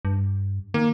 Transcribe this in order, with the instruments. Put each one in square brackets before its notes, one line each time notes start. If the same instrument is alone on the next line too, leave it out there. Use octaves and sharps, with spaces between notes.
[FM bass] G2
[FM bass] D#3 [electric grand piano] A#3